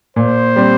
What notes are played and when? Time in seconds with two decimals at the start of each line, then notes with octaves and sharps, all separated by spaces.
0.16 A#2 C5
0.56 G3 C4